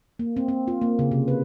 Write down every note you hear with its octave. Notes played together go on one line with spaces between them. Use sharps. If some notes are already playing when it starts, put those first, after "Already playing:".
A#3
C4
C4
F4
A#3
C#3
C3
B4